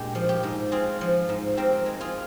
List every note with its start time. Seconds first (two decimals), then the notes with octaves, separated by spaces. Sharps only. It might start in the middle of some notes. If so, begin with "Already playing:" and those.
Already playing: A#2 G#3 D4 G4
0.15 F3
0.29 G4
0.43 G#2
0.71 C4 F4 G#4
1.01 F3
1.29 G#2
1.57 C4 G4 A#4
1.86 G#3
2.01 F4 G#4